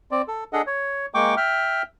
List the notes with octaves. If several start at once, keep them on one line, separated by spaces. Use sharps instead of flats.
C4 D5
A4
D4 G#4 A4 D#5 F#5
C#5
G#3 A#3 G5 C#6 D6
E5 G5 F6